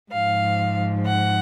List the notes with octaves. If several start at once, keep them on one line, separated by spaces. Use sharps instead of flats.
G#2 F3 F5
F#5